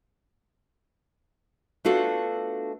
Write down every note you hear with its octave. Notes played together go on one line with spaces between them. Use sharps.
A3 B3 D4 F4 F#4 A4